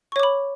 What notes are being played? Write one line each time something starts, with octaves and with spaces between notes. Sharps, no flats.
C#5 B5 C#6 D6